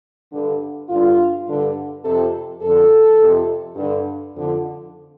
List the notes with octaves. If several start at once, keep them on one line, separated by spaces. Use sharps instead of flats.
G2 D3
G2 D3 F4
G2 D3
F2 C3 A4
F2 D3 A4
F2 C3
G2 D3
F2 D3